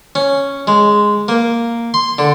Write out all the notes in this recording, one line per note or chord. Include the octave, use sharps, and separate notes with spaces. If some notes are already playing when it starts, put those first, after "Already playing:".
C#4
G#3
A#3
C6
D3